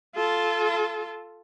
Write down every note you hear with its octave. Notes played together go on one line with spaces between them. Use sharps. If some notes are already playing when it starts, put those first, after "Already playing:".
F4 A4